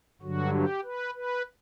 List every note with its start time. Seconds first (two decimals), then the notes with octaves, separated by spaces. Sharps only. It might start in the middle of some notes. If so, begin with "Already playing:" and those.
0.21 G2 D3 F#3 F#4
0.53 G4
0.83 B4
1.14 B4